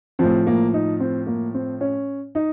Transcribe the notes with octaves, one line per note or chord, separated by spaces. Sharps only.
A2 F3 C4
A#3
D#4
C4
A#3
C4
C#4
D#4